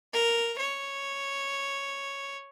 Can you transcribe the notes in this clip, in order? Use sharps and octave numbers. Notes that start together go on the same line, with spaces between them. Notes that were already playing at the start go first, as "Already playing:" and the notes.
A#4
C#5